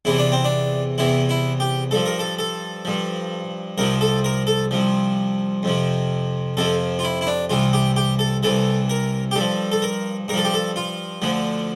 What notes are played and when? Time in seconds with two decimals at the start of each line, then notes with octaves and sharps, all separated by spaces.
0.05 E2 C3 E3 E4
0.18 D4
0.32 C4
0.44 D4
0.98 E2 C3 E3 E4
1.29 E4
1.60 G4
1.91 G2 F3 A4
2.06 A#4
2.19 A4
2.39 A4
2.85 G2 F3
3.78 C2 C3 F3 A#4
4.01 A4
4.24 A#4
4.47 A4
4.71 C2 C3 F3
5.63 F2 C3 F3
6.57 F2 C3 F3 A4
6.99 F4
7.04 E4
7.21 E4
7.27 D4
7.50 C2 C3 E3 F4
7.73 G4
7.96 G4
8.19 A4
8.43 C2 C3 E3 A4
8.90 A#4
9.31 G4
9.35 G2 F3 A4
9.72 A4
9.82 A#4
10.28 G2 A#4
10.34 F3 A4
10.45 G4
10.54 A4
10.76 F4
11.22 D2 D3 F3